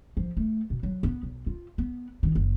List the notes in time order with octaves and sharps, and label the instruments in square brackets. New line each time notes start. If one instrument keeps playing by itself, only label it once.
[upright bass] F3
A3
B2
F#3
B3
B1
F4
B3
D#3
F#1